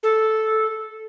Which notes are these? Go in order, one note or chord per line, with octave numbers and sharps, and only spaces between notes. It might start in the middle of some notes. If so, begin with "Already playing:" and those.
A4